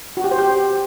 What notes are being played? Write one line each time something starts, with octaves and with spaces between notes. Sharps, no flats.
F#4
G4
C5
G4